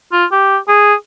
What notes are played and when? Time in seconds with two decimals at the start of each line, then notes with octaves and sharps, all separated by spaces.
0.12 F4
0.32 G4
0.68 G#4